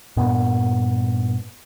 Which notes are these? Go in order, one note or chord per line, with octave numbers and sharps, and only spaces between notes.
G2 A#2 B3